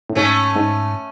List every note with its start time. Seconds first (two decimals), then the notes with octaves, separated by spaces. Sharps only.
0.10 A2
0.15 G#2 A3 C#4
0.56 G#2